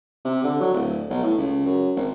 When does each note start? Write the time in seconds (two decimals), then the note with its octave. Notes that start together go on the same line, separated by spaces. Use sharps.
0.25 C3
0.43 D3
0.60 F#3
0.73 D1
1.09 B1
1.23 A2
1.37 C#2
1.66 F#2
1.96 G#1